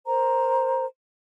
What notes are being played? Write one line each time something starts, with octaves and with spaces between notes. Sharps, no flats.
A#4 C5 A#5